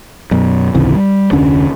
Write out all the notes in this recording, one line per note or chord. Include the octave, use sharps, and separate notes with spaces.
F#2 B2
G#1 C#2 C3 E3
G3
F1 D2 D3 C#4